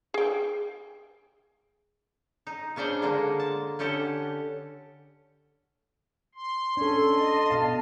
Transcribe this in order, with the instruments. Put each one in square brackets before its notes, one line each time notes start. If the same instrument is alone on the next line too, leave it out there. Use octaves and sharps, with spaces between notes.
[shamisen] G#4 G5
[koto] D#4
C#3 C#4 D4 C5 D5
D3 G#3 A#3 D4
A5
D3 C#4 G4 A4 F#5 A5
[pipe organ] C6
[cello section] C#4 [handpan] D4 A4
[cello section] D#5 [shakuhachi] A5
[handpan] B2 F5